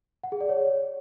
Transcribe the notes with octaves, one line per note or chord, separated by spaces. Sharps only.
F#5
G#4
D5
C#5